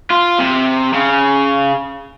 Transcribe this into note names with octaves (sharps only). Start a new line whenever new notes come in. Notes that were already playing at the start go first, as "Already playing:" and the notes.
F4
C3
C#3